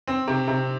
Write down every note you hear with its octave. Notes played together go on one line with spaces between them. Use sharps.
C4
C3
C3